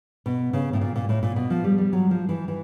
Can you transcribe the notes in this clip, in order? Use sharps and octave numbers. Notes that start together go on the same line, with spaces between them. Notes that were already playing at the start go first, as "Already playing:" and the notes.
B2
C#3
A2
A#2
A#2
A2
A#2
B2
F3
G3
G3
F#3
F3
E3
E3